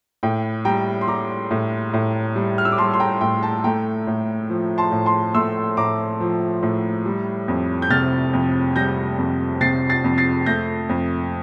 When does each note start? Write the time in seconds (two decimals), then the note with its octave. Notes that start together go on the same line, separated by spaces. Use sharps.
0.23 A2 G5
0.65 G3 G5 A#5
1.01 C6
1.08 G3 A#5 D6
1.51 A2
1.93 A2
2.36 G3
2.58 F6
2.65 E6
2.72 D6
2.78 G3 A5 C6
2.94 C6
3.00 G5 A#5
3.21 A2 G5
3.43 A5
3.64 A3 G5 A#5
4.07 A2
4.50 F3
4.78 A5 C6
4.92 A2
5.06 A5 C6
5.34 A3 C6 E6
5.77 A2 A#5 D6
6.20 F3
6.63 A2
7.06 G3
7.48 F2
7.82 G6
7.90 C3 F6 A6
8.33 F2
8.76 G3 G6 A#6
9.18 F2
9.61 C3 A6 C7
9.89 A6 C7
10.04 F2
10.18 A6 C7
10.46 A3 G6 A#6
10.89 F2